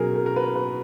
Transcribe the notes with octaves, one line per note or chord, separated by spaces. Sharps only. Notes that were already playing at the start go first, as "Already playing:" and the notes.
Already playing: B2 F#3 C#4 G#4 A#4
A#4
A#4
B4
B4